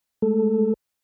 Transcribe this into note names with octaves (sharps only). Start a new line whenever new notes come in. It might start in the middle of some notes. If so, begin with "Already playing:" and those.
G#3 A3 A4